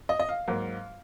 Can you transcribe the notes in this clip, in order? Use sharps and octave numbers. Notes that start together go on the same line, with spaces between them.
D#5
D#5
F5
G#2 F#3 A#3